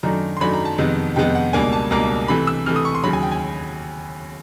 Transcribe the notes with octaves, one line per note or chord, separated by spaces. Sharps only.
F#2 D#3 F#3 A3 D4 A#5
C6
F#2 D#3 F#3 A3 D4 B5
A#5
A5
F2 C3 D#3 G#3 B3
F2 C3 D#3 G#3 B3 G5
F#5
C#2 B2 G3 A#3 D4 G#5
A5
C#2 B2 G3 A#3 D4 A#5
C3 E3 A3 B5
E6
C3 E3 A3 F6
D#6
C#6
C6
D#2 C#3 F#3 B5
G#5
G5
G#5